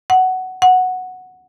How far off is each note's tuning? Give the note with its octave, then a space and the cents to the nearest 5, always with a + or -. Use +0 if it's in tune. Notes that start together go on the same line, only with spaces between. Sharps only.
F#5 +10
F#5 -5